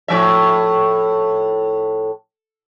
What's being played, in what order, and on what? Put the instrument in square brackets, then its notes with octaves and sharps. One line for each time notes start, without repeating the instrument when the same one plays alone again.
[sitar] A2 F3 E5